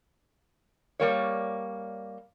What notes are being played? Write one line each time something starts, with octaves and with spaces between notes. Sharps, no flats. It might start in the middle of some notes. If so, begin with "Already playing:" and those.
G3 A#3 C#5